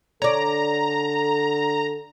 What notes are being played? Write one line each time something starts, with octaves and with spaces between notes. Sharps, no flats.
D3 A4 C#5 D5 A#5